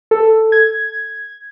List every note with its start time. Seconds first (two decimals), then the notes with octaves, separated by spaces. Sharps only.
0.11 A4
0.52 G#6